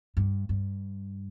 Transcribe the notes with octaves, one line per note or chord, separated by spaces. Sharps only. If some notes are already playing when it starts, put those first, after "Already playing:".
G2
G2